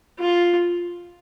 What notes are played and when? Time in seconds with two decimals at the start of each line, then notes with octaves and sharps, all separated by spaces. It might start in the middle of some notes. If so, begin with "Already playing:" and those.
0.20 F4